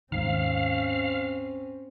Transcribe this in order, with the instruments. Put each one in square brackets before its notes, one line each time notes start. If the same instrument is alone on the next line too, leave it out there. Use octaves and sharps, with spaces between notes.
[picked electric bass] D#2 G#2 D#3 [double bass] C4 C#4 [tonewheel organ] F5